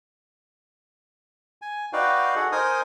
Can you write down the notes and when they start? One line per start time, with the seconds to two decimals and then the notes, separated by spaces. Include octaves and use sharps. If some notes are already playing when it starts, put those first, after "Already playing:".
1.62 G#5
1.93 D#4 F#4 B4 D5 F5 G5
2.36 F#4 G#4 A4 F#5
2.52 D#4 A#4 C5 G#5 D#6